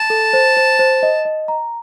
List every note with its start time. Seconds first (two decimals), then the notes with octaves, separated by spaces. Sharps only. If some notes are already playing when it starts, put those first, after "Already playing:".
Already playing: A5
0.10 A4
0.33 C5
0.57 C5
0.79 C5
1.03 D#5
1.25 D#5
1.48 A#5